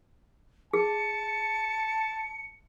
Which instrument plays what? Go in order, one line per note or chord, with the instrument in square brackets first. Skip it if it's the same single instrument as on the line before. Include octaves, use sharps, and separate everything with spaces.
[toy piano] G#4 [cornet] A5 [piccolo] C#7